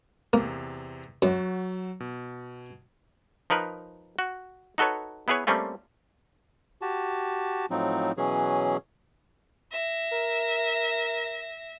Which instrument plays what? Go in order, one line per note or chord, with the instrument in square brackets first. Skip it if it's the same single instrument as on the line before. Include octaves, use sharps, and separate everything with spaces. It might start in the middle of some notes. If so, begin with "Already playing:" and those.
[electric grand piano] E2 C3 [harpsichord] A#3
[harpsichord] F#2 [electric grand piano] F#3 F#4
[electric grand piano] B2
[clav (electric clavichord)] F3 D#4 A#4 B4
F#4
D#4 F#4 A4 B4 C#5
B3 E4 G#4 B4 C#5
G3 A3 A#3 C4 C#4 F4
[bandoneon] F#4 G4 A5
A2 F3 F#3 C4 D#4
B2 E3 F#3 C#4 G#4
[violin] E5 A#6
[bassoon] A#4